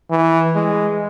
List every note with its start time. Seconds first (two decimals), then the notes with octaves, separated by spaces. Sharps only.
0.11 E3
0.56 G#3